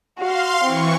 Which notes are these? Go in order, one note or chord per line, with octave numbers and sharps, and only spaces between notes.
F#4 F5 C6
E3 C4 C#6